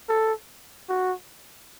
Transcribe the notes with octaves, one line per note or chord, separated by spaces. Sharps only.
A4
F#4